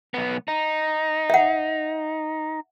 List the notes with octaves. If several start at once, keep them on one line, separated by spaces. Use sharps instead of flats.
B1 B3
D#4
E5 F#5